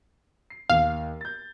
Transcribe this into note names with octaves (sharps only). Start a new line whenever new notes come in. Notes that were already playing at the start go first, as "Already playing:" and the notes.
C7
D#2 F5
G6 A6